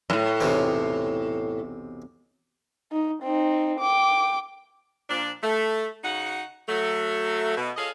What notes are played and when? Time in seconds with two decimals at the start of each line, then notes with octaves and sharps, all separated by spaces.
0.10 F#2 A2
0.41 B1 E2 C3
2.92 D#4
3.23 C4 D#4
3.80 G5 D6
5.10 A#2 F3 D4
5.43 A3
6.04 C#3 D#4 F#4 F#5
6.69 F#3 A3
7.57 B2
7.77 F4 G#4 A4 C#5 D#5 F5